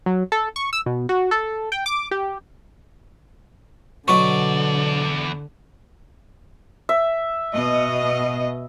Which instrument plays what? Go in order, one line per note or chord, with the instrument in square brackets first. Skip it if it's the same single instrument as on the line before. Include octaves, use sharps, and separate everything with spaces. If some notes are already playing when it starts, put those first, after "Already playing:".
[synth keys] F#3
A4
C#6
E6
B2
F#4
A4
G5
D6
G4
[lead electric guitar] E2 D5 [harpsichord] B2 F#3 B4 [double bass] D3 [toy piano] C#6
[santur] E5
[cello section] B2 D#5